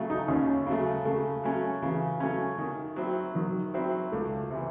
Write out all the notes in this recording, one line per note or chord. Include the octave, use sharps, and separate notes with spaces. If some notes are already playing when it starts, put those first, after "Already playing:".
Already playing: C#3 F#3 A3
D#4
D#2 C#4
C#3 F#3 A3
C#3 A3
F#3 A3 C#4
C#3 E3
F#3 A3 C#4
D#3
F#3 C4 E4
D#3 F#3
F#3 C4 E4
C#2 A3
C3 E3